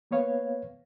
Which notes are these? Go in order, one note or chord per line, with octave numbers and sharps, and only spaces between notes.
A#3 B3 B4 C#5 F5